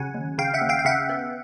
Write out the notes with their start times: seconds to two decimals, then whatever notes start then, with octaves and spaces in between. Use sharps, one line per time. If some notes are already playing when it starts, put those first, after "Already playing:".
Already playing: C#3 F#3 F#5 G#5
0.14 D#2
0.38 C#3 F5 G5
0.54 E5 F#5
0.61 D#2
0.69 F5 G5
0.79 F5
0.85 C#3 E5 F#5
1.09 B3